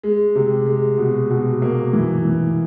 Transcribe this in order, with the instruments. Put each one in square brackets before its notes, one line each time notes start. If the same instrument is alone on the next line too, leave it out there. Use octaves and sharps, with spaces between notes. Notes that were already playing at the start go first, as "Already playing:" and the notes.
[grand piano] G#3
C3
G#3
B2
B2
A#3
E3
E3